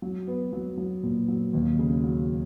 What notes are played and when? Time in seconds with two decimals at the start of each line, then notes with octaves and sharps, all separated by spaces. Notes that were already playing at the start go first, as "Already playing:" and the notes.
0.02 F#3
0.27 B3
0.53 F#3
0.78 F#3
1.03 A#2
1.28 F#3
1.53 D#2
1.79 C#3
2.04 F#3